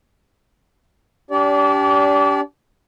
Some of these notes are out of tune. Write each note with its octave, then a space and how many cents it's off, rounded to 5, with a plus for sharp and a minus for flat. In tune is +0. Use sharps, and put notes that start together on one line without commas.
D4 -35 G4 -10 D5 -30